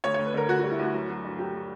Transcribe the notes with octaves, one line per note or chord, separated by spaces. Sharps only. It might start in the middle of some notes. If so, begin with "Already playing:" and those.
D2 C#5
D2 C#5
B4
D3 A#4
D2 F#4
G3 F#4
E4
D2 F#4
F#3
F#3
G2
F#3 G4
F#3